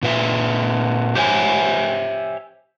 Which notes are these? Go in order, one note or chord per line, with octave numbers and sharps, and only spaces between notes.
A#2 B4 E5
G4 C5 C#5 E5 G#5